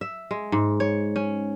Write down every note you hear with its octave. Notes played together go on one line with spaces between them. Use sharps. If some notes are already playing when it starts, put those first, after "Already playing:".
E5
G#3
G#2
C#5
C#4